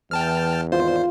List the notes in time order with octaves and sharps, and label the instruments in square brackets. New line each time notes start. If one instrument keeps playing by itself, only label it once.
[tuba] E2 [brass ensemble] E3 [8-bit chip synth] G5 A5 F6
[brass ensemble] G#1 D5 [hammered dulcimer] F4 [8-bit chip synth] C5